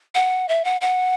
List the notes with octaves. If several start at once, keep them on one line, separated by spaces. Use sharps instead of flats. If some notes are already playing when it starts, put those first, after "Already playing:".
F#5
E5
F#5
F#5